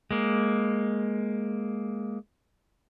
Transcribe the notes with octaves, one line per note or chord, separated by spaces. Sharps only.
G#3 A#3